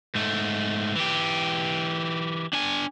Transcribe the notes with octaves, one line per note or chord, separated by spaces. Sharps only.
G#2 A3
E3 G4
D4 G#5